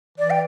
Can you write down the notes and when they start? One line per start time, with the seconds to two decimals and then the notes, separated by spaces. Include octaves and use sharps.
0.18 E3 D5
0.30 G5